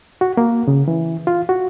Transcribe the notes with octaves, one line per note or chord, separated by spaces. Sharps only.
F#4
A#3
C#3
E3
F4
F#4